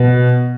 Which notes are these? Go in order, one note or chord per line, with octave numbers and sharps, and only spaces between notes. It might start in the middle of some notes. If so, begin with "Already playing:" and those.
Already playing: B2